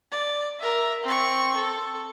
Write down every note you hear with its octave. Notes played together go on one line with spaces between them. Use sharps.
D5
A#4 E5
C4 C#6
A4